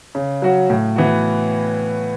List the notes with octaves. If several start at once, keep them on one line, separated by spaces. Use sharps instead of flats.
C#3
F#3 C#4 F#4
A2
E3 B3 F#4